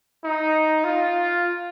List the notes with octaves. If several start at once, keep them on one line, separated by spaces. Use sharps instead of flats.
D#4
F4